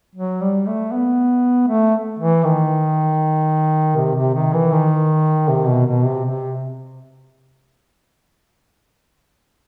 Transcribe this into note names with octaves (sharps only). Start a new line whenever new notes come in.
F#3
G3
A3
B3
A3
E3
D#3
C3
C3
D#3
E3
D#3
C3
B2
B2
C3
C3